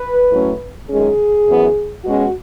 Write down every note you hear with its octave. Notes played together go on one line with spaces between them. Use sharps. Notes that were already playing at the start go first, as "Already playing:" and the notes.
Already playing: B4
A2 F#3 A3 C#4
F#2 D#3 G#3 C#4 G#4
F#2 E3 B3
B2 G#3 C#4 F#4